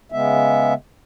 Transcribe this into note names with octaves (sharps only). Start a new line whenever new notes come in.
C#3 G#3 B3 E5